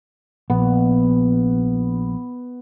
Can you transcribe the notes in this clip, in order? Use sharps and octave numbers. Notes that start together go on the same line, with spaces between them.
A#1 B3